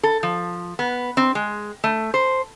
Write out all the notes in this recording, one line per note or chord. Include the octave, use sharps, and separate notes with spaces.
A4
F3
B3
C4
G#3
A3
C5